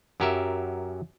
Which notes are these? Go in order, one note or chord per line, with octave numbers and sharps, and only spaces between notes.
F#2 F#3 G4 A#4 E5